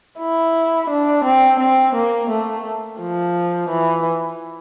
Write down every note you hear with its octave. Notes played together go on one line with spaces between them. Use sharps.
E4
D4
C4
C4
A#3
A3
F3
E3